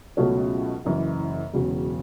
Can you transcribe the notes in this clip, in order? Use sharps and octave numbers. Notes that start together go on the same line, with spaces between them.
C#2 B2 F#3 A3 C#4
F#1 F#2 E3
E1 E2 C#3 F#3